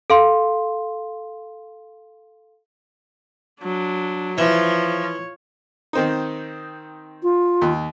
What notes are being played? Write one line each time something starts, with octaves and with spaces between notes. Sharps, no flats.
A4 F5 C6
F#3 D4
E3 F3 C#5
D#3 C4 D#4
F4
D#2